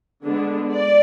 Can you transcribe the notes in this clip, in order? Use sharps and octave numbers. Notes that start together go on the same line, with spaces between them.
D3 G#3 B3 D4
D5